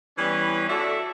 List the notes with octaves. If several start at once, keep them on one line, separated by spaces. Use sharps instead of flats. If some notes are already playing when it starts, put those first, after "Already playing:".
E3 G3 B3 C#4 B4
F#4 A4 D5 E5